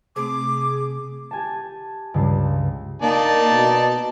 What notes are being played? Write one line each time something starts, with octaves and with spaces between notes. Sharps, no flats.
C3 A3 C4 G#4 D6
G4 G#5 A5
C#2 G2 C#3
A#3 D#4 D5 A5
B2